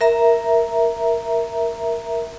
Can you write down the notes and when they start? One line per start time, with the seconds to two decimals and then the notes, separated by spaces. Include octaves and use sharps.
0.01 A#4 E5 A#5